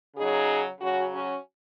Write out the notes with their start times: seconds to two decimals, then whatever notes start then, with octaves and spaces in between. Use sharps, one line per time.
0.16 C#3 F#3 D#4 G#4
0.80 C#3 F#3 C#4 F#4
1.12 C#4 F#4